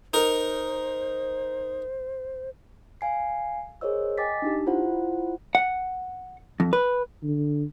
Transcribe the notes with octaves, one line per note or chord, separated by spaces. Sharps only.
D#4 A#4 C5
F5 G#5 C7
G#4 A#4 C5 C#5 D#5 E6
D#5 G5 G#5 D6 A6 B6
D4 D#4 G4
E4 F4 C5 F#5
F#5
F2
B4
D3